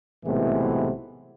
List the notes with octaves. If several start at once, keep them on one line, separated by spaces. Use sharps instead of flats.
B1 A2 C3 E3 G#3 B3